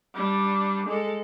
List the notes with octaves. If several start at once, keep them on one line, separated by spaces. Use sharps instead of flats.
G3 D4
G#3 A4